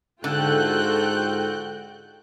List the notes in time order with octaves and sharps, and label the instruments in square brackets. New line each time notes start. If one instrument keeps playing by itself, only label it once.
[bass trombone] G#2 [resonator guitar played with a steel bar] D3 [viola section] F4 F#4 A4 [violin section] G5 F#6 G6